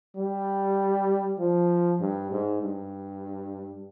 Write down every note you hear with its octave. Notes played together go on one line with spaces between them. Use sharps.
G3
F3
G2
G#2
G2